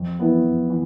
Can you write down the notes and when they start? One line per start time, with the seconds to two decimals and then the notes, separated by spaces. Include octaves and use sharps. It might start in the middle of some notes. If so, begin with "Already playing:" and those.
Already playing: F2
0.19 E3 B3 E4 B4
0.44 F2
0.70 E3